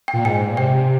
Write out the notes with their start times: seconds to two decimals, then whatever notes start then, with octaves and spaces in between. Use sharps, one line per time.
0.08 G5
0.14 A#2
0.25 G#2 G#5
0.51 A#2
0.57 C3 G5